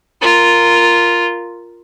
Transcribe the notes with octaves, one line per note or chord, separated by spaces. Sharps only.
F4 A#4